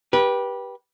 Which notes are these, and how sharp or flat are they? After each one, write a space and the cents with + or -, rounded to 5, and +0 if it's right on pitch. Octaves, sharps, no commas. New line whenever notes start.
G4 +0 B4 -25